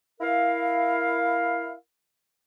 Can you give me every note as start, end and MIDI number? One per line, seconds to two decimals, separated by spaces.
0.21 1.73 64
0.21 1.73 70
0.21 1.73 77